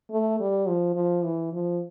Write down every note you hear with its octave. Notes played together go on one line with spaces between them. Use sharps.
A3
G3
F3
F3
E3
F3